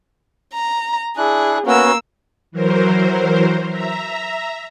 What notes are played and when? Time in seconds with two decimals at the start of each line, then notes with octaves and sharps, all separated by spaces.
0.53 A#5
1.17 D4 E4 G#4 F#6
1.67 A#3 B3 C#4 F#4 E6
2.52 E3 F#3 A#4 C5
3.69 E5 A#5